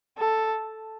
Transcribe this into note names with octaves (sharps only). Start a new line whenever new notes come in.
A4